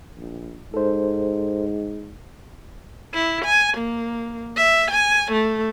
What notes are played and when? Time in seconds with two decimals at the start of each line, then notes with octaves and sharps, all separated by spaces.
0.17 A#1
0.74 G#2 A4 C5
3.14 E4
3.45 G#5
3.78 A#3
4.57 E5
4.91 G#5
5.32 A3